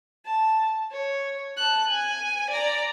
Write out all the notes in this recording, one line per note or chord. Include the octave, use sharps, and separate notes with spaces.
A5
C#5
A5 F#6
G#5
D5 A#5